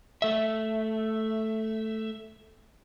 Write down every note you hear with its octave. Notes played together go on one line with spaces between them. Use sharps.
A3 E5